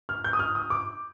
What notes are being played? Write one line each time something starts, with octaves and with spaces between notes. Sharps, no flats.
F6
G6
D#6
F6
D#6
D6